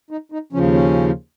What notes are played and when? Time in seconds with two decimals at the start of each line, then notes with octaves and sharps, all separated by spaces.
0.11 D#4
0.32 D#4
0.53 D#2 C#3 F3 C#4
0.74 C#4